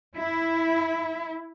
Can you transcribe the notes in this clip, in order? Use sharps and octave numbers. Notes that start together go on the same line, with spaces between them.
E4